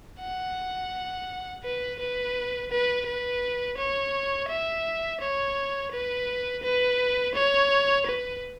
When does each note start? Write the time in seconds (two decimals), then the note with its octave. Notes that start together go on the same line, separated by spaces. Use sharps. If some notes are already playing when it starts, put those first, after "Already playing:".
0.20 F#5
1.64 B4
2.00 B4
2.71 B4
3.06 B4
3.78 C#5
4.49 E5
5.21 C#5
5.92 B4
6.63 B4
7.34 C#5
8.07 B4